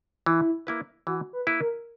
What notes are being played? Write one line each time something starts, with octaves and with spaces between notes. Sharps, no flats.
E3 E4
A#3 E4 B4
E3 F#4
B4
A#3 E4 B4
A#4